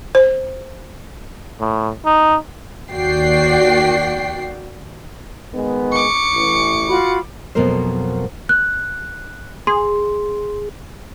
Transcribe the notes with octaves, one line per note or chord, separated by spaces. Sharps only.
C5
A2
D#4
D#2 F#4 D5 G5 C7
D#3 G#3 B3
C#6 D6 C#7
A1 E3
F4 F#4 B5
F2 B2 F#3 A#3 A#4 C5
F#6
G#4 C6